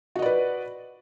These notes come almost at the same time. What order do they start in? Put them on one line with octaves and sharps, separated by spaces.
F#4 D#5 D5 B4